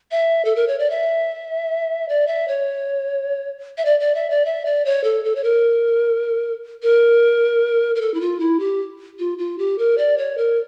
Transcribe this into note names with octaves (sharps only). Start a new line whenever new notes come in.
E5
A4
A#4
C#5
D5
E5
D5
E5
C#5
E5
D5
D5
E5
D5
E5
D5
C#5
A4
A4
C#5
A#4
A#4
A#4
A4
E4
F4
E4
G4
F4
F4
G4
A#4
D5
C#5
A#4